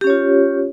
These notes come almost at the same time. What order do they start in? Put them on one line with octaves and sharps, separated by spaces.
G4 C#4 C#5 F4